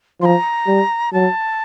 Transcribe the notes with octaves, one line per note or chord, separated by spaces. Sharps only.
F3 A#5 C6
G3
F#3 A5